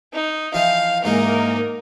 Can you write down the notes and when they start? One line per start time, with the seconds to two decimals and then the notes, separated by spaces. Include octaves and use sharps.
0.13 D#4
0.54 E3 F3 D#4 F5
1.04 G#2 E3 G#3 A#3 D#4 A#4